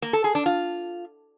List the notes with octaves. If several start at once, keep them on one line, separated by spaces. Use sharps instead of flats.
A#3
A4
G#4
D4
F4